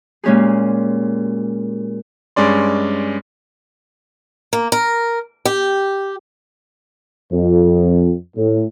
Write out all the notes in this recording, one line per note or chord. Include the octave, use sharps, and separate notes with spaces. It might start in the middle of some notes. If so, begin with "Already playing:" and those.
A#2 G#3 C#4 G4 G#4
G2 G#3 C#4 D5 C6
A#3
A#4
G4
F2
A2